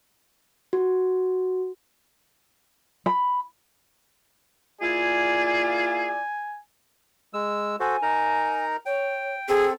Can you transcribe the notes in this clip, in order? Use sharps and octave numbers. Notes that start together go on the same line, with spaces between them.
F#4
B5
A#3 E4 F4 G#4 D5 G#5
G#3 E6
F#4 A4 C5 G#5
D#4 A#4 A#5
C#5 G5
C4 G#4 A4 G5